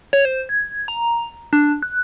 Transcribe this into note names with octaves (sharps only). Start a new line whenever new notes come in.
C#5
C5
G#6
A#5
D4
F#6